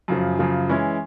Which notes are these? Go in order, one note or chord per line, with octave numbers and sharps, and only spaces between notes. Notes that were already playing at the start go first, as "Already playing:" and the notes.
F#2 C#3 F3
F#2 C#3 F3
E3 G#3 C#4 E4